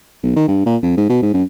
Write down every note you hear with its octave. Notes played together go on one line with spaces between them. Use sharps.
B1
D#3
G2
A#2
F2
G#2
B2
G#2
F#2